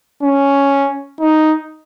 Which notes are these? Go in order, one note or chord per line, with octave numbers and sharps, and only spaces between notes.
C#4
D#4